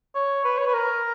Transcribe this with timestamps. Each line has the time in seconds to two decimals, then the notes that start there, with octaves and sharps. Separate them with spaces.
0.15 C#5
0.44 B4
0.58 C#5
0.67 B4
0.73 A#4